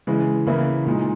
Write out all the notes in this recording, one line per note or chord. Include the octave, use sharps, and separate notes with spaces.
C#3 E3 G#3
C#3 E3 A#3 E4
A#2 G#3 D#4